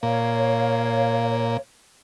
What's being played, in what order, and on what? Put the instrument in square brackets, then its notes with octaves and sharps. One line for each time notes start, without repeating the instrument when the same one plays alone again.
[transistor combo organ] A#2 [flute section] C#5 F5